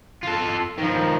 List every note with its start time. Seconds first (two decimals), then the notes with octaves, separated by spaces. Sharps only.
0.23 F4 A4
0.78 D#3 F3